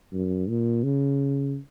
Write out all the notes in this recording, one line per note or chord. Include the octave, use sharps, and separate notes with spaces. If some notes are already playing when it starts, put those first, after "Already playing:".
F#2
A#2
C#3